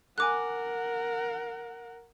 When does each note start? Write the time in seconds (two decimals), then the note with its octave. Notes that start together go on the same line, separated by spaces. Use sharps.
0.18 A#4 F#5 G#5 D6 F#6